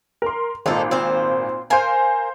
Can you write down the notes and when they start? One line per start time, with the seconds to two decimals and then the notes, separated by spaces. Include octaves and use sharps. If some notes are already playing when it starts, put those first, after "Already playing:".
0.22 A#4 C6
0.66 G#1 A#2 D#4 A4
0.91 C4 F4 C5
1.70 A#4 C5 F5 G#5